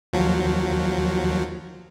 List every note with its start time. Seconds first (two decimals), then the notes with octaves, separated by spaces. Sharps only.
0.13 D#2 F3 F#3